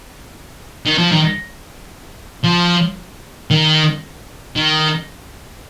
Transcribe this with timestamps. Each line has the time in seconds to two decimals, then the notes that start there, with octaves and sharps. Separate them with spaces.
0.85 D#3
0.98 F3
1.12 D#3
2.44 F3
3.51 D#3
4.56 D#3